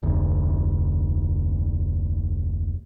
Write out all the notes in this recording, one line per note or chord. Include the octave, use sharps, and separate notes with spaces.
F1 D2